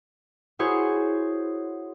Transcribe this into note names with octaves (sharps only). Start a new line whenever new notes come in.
E4 F#4 G#4 C5 C#5